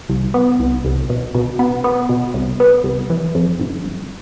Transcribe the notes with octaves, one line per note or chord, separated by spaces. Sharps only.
C2
B3
C2
C2
B2
B2
B3
B3
B2
C2
B3
C2
E3
F2
G1
G1